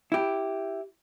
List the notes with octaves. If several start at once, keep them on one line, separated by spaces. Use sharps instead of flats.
E4 G4